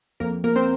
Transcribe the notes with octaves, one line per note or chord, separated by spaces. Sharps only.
F2 A#3 A#4
F3 A#3 A#4
C4 C5